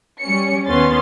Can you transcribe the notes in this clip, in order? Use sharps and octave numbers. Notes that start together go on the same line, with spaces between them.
G3 C#4 C#7
D#2 B3 C#4 C6 A6